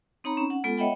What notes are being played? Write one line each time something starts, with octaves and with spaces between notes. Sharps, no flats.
C4 D#4 C#5 A#5 B5
C#4
F#5
G#3 B3 F4 A4
C#5 D#5 E5 F#5 G5 B5